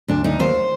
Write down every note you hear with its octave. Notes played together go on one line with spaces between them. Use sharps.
D2 D4
D2 D#4
D#2 C5